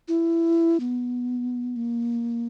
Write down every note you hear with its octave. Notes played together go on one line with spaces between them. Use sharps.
E4
B3
A#3